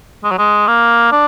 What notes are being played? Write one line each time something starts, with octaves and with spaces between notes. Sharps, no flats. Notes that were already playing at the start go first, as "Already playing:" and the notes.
G#3
F#3
G#3
A#3
D4